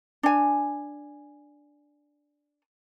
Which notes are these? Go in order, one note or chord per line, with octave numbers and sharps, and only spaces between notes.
D4 G#5